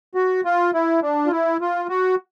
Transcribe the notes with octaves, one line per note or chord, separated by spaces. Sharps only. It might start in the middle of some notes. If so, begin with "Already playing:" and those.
F#4
F4
E4
D4
F4
E4
F4
F#4